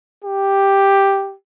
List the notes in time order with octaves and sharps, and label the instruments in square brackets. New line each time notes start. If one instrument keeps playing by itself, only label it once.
[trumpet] G4